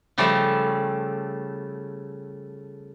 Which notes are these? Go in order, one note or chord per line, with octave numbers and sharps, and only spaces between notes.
C#3 F3 G3 A3